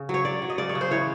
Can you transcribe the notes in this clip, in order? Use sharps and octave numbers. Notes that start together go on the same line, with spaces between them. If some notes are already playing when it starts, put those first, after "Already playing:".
Already playing: C#3
F#3 C#5
F#3 D5
F#3
D#5
C#3 D5
C#5
C#3
C5
E3 C#5